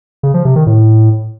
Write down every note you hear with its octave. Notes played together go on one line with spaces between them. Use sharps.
C#3
F3
C3
D#3
A2